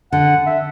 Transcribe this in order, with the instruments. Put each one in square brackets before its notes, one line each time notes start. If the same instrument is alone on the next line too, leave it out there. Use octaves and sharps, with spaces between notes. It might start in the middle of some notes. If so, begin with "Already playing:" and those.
[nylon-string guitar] D3 [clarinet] F#5
[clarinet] E5